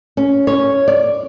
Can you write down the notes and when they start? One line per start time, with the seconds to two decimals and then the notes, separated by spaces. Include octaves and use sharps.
0.17 C#4
0.47 C#5
0.88 D5